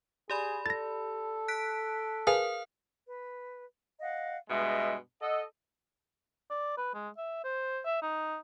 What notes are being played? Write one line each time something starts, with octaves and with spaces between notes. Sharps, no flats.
G4 G#4 D5 B5
A4 A6 A#6
F#6 B6 D7
G#4 A#4 B4 F5 G#5
B4
D#5 F5 F#5
G2 B2 G#3 D#5 E5
A4 D#5 F#5
D5
B4
G#3
E5
C5
E5
D#4